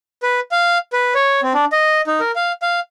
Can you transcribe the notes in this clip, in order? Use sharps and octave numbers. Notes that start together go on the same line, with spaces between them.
B4
F5
B4
C#5
C4
D4
D#5
D#4
A#4
F5
F5